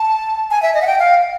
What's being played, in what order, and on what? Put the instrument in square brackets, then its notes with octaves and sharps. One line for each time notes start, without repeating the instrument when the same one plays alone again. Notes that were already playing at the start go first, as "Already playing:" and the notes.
Already playing: [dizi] A5
G#5
E5
D#5
F#5
G5
F5